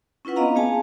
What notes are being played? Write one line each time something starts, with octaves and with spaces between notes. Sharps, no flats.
C#4 E4 F4 B4 F#5
B3 C4 D4 D#5 F5 A#5
A#3 C4 G#4 F5 G#5 A5